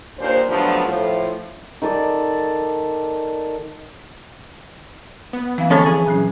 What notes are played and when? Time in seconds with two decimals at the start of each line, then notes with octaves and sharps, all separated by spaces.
0.18 D#2 A#2 D4 C5
0.48 G2 F3 F#3 A3 B3 D4
0.85 A2 F3
1.82 D#3 A4 D5
5.33 B3
5.58 E3 C4 F5
5.71 D3 F3 C4 C#4 A4 C#5
5.86 G#4
6.06 A#2 F#3 C#4